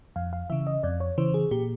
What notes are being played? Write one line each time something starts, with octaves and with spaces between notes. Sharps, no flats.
F2 F5
F5
C#3 E3 E5
D#5
F2 D5
C#5
C#3 E3 C5
G#4
A#2 G4